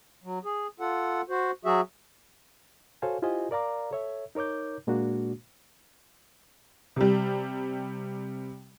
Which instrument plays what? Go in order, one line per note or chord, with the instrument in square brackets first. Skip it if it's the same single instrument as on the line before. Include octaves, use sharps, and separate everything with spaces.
[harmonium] F#3
G#4
F4 A4 F#5
F#4 C5
F#3 F#4 G#4 E5
[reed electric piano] F#4 A4 C5 C#5 F5 G#5
E4 F4 G4 C5 D#5 G#5
A#4 D5 F5 A#5 D6
A4 C#5 E5
D#4 A#4 C#5 D6 G6
A#2 G#3 A#3 D4 F#4
[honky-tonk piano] C3 G3